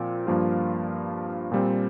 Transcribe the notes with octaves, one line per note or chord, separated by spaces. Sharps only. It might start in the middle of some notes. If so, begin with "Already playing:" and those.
Already playing: A#2 F3 C4 F4
G2 F3 A#3 F4
A#2 G3 C4